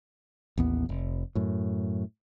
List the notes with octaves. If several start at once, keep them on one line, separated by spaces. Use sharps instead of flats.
A1 D#2 B3
F1
F#2 A2